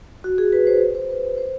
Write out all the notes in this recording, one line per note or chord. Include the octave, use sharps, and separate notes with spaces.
F#4
G#4
B4
C5
C5
B4
C5
C5